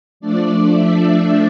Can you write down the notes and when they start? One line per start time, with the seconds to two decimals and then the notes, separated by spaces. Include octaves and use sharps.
0.20 F3 A3 D4 D5
0.74 E5